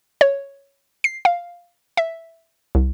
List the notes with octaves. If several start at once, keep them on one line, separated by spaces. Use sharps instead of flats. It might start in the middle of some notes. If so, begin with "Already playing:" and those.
C#5
C7
F5
E5
C2